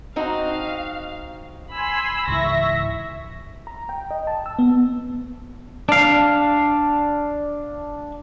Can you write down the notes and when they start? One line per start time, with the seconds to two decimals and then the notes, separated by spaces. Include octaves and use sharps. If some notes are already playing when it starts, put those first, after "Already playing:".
0.16 C4 D#4 F#4 F5
1.71 G#5 B5 C6 E6
2.28 C#2 G#2 E3 E5 C#6 A#6
3.67 A#5
3.89 G5
4.11 D#5
4.27 A5
4.46 E6
4.59 B3
5.89 D4 F5